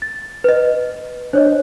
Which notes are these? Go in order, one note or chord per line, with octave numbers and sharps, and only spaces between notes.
A6
B4 D#5
D4 C5 C#5 D#5